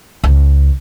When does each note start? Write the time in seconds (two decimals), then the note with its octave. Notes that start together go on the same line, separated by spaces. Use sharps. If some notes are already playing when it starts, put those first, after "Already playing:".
0.24 C#2